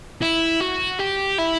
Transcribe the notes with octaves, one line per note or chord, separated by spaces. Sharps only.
E4
F#4
G4
E4